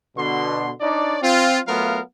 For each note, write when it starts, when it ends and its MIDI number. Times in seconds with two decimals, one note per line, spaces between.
0.17 0.72 47
0.17 0.72 50
0.17 0.72 84
0.81 1.18 62
0.81 1.18 63
0.81 1.18 73
0.81 1.18 74
1.22 1.59 60
1.22 1.59 65
1.68 2.00 54
1.68 2.00 57
1.68 2.00 59
1.68 2.00 65
1.68 2.00 70
1.68 2.00 77